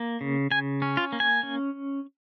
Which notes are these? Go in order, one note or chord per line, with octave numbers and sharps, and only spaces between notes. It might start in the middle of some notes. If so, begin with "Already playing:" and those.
Already playing: A#3
C#3
C#3 G#5
C#4
F4
A#3
G#5
C#4